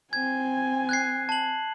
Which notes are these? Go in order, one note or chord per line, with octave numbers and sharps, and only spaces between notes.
C4 G#5 G#6
F#6 G#6 C7
A5 F#7